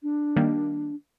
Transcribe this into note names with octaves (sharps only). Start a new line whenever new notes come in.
D4
D#3 G3 A#3